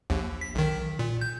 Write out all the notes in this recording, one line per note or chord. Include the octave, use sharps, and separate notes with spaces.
A#1 D#2
B6
B1 D#3
A#2
G6